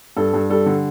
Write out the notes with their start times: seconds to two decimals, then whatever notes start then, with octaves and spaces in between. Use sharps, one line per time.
0.16 G2 A4
0.34 G2
0.50 G3 A4
0.66 D3